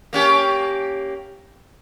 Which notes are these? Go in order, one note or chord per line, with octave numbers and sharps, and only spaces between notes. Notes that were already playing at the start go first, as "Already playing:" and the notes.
A#3 C#4 G4